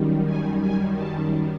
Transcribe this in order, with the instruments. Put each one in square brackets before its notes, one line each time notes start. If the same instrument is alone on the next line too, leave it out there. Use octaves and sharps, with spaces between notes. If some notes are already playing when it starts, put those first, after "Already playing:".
Already playing: [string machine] F#2 D#3 G3
G#5
G#5
A5